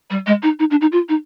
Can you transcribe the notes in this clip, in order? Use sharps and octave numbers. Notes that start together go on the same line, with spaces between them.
G3
G#3
D#4
D#4
D4
D#4
F4
D#4